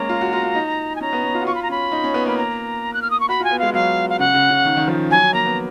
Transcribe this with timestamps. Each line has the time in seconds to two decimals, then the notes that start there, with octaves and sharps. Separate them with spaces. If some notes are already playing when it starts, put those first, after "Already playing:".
Already playing: G#3 A#3 C#4 A#5
0.09 F4
0.21 F#4
0.33 F4
0.43 F4
0.55 D#4
0.96 G#5
1.01 C#4 A#5
1.13 B3
1.24 C#4
1.35 F4
1.41 F#4
1.46 F4 C#6
1.55 B5
1.63 A#5
1.69 C#4 B5
1.92 D#4
2.04 C#4
2.14 B3
2.26 A#3 B5
2.38 A#5
2.94 F#6
3.02 F6
3.11 D#6
3.20 C#6
3.29 F#4 B5
3.40 F4 G#5
3.51 B3
3.59 G#3 F5
3.74 F#3 F5
4.10 F5
4.19 C#3 F#5
4.34 C#3
4.51 C#3
4.65 D#3
4.77 D#3
4.88 F3
5.10 F#3 G#5
5.22 F#3
5.33 A#3 A#5
5.46 B3